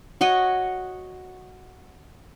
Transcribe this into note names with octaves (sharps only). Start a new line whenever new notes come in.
F#4 C#5 D#5 F#5